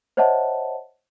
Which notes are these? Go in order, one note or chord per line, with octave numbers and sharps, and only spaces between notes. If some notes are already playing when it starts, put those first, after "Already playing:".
C5 C#5 D#5 E5 F#5 A5